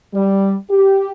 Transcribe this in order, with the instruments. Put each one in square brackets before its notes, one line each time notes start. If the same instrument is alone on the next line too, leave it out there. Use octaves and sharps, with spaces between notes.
[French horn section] G3
G4